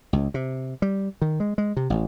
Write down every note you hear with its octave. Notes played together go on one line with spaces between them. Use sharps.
C#2
C3
G3
D#3
G#3
G#3
C3
A1